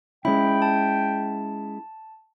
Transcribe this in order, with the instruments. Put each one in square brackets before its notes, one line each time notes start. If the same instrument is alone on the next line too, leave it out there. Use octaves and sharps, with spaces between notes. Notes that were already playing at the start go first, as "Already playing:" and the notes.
[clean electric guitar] G#3 C#4 E4 [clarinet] G5 [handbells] B5
[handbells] A5